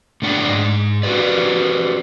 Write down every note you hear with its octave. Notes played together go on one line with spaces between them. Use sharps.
A2 D3 D4 F#5 G5
G#2 D#5
F#4 G4 A#4 B4 D5